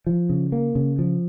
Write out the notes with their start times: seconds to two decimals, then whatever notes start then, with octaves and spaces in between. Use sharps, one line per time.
0.07 F3
0.30 C#3
0.52 A#3
0.75 C#3
0.99 F3